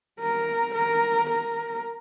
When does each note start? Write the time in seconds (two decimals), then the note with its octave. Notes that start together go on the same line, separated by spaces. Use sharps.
0.20 A#4
0.75 A#4
1.30 A#4